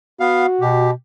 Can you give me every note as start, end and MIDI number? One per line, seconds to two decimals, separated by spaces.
0.20 0.46 59
0.20 0.85 66
0.20 0.46 77
0.61 0.91 47
0.61 0.91 67